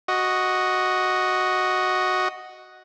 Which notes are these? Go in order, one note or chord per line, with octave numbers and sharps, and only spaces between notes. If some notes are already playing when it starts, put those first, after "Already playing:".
F#4 D#5